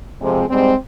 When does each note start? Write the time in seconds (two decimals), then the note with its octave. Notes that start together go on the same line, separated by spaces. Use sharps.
0.20 F2 C3 F3 G#3 C4
0.49 G#2 G3 G#3 C4